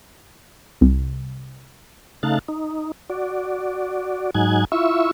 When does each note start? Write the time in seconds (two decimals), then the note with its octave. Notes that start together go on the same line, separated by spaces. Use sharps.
0.81 C2
2.23 C#3 A3 D#4 F5 F#6 A6
2.48 D#4
3.10 F#4 D5
4.35 G#2 F#3 D#4 G#5 F#6 G#6
4.72 E4 F4 E5 C#6 E6